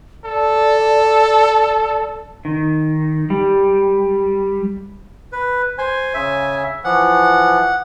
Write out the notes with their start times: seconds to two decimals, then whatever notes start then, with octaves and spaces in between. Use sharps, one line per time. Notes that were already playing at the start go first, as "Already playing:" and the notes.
0.25 A4 D5
2.45 D#3
3.30 G3
5.32 B4
5.78 C5 G#5
6.14 C#3 E5
6.84 E3 F3 F#5